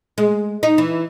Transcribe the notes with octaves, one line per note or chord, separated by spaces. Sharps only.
G#3
D#4
E3